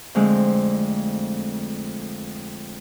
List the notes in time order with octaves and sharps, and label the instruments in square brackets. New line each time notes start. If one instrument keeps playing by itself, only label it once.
[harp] F2 D3 G#3 A3 C4